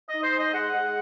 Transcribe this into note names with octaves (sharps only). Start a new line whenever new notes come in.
D#4 D#5
C5
G#3 D#5
G#3 F#5
G#3